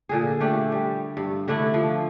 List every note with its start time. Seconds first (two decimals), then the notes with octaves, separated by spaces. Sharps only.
0.09 A#2 D3 G#4
0.40 A3 D4 G4
0.72 G3
1.17 G2
1.48 D3 A3 D4 E4
1.74 F3